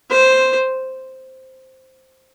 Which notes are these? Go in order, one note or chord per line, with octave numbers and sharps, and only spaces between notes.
C5